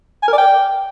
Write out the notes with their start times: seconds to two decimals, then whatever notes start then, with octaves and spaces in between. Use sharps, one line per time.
0.23 G#5
0.28 A#4
0.33 D5
0.38 G5